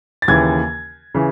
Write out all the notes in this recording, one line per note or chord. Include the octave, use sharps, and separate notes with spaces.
A6
D#2 C#3 E3 G#6
C#3 E3